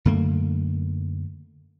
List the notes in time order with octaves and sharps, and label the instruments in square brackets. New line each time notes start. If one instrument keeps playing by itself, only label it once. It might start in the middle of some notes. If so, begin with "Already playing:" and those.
[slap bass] F#2 D3 A3 A#3